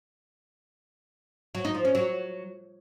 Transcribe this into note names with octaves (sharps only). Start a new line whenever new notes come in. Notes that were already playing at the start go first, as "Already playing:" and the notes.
F#3
D#4
F3
C#4
F#3